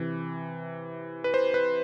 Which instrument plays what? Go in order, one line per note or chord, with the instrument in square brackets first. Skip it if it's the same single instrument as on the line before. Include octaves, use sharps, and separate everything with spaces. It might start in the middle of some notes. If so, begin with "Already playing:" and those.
Already playing: [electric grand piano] C3 E3
B4
C5
B4